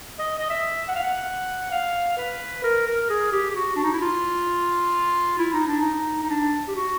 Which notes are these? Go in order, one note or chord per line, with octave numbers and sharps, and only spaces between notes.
D#5
D#5
E5
F#5
F5
F#5
F5
B4
A#4
A#4
G#4
G4
G4
F#4
D4
D#4
E4
F4
E4
D#4
D4
D#4
D#4
D4
G4
F#4